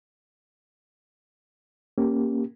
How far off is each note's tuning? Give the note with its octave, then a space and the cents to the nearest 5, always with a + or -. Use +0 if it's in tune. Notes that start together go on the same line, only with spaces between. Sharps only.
A#3 +0 C#4 -10 G4 +0